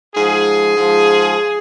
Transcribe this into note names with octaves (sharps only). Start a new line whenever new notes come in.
G#2 F3 G#4
G#2 F3